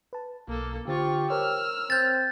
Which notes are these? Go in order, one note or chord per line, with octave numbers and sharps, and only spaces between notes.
B4 A5
B1 A#3 A4
D3 F4 G4 C5 C#6 A6
A#4 C5 C#5 E6 F6
C4 G6 A6